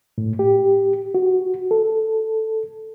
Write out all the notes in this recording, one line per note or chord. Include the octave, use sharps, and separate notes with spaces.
A2
G4
F#4
A4